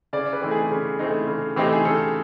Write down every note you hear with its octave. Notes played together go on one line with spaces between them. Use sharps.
C#3 D5
B4
E3 A3 C4 D#4
G#4
C#3
E3 A3 C4 D#4
C#3
E3 A3 C4 D#4 G4
G#4
C#3 A4